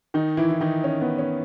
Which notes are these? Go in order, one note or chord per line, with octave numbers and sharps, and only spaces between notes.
D#3 D#4
E3 E4
E4
D#3 D#4
C#4
B3
C#4